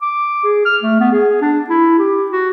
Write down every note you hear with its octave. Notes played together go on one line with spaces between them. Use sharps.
D6
G#4
F6
A3
B3
G#4
D4
E4
G4
F#4